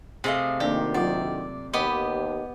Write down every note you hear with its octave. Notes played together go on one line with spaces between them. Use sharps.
C3 A3 G#4 D#5 F5
D2 D#3 A#3 D4 G4 D5
F#3 F4 D5 F#5
D#2 B3 G4 D#5 D6